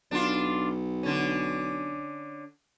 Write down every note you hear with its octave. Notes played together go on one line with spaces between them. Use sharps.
B1 D4 F4
D3 C#4